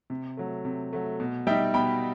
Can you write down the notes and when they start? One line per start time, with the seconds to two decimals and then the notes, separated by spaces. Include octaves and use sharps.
0.10 C3
0.37 F#3 A3
0.65 C3
0.93 F#3 A3
1.20 B2
1.47 G3 D#4 E5 G5
1.74 B2 G5 B5